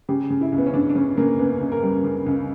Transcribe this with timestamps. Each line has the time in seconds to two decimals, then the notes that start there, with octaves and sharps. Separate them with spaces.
0.09 C#3 G4
0.30 C#3
0.41 E4
0.52 C#2
0.58 B3
0.66 C#4
0.74 C#3 D4
0.90 D4
0.95 C#3 C#4
1.17 C#3 A#3
1.39 C#2 B3
1.60 C#2
1.72 A#4
1.83 G3
2.04 C#3
2.26 C#2